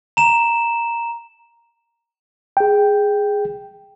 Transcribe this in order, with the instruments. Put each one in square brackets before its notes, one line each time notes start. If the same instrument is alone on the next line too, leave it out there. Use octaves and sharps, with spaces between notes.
[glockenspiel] A#5 E7
[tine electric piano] G#4 G5